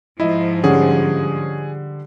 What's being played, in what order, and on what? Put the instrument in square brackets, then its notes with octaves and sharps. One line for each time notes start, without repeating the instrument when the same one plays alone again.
[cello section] G#2 F3 [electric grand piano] E4 [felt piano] D#5
[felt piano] D3 G3 [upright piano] C#4 [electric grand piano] G#4